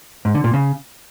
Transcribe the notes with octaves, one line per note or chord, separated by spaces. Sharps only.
G#2
D3
A#2
C#3